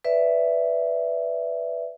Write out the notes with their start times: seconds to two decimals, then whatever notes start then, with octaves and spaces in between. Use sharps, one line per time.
0.05 B4 D5 E5